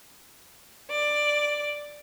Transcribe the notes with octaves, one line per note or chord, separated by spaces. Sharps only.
D5